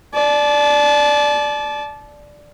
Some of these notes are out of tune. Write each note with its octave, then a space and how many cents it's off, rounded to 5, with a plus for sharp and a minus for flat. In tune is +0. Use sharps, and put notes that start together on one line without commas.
D5 +0 A5 -30